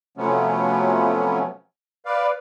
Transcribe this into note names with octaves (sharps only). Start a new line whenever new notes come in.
C3 F3 F#3 A3 B3 C#4
B4 D5 F5